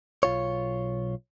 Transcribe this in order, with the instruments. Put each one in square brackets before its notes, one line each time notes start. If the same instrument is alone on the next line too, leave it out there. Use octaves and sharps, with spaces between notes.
[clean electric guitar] B1 F4 C#5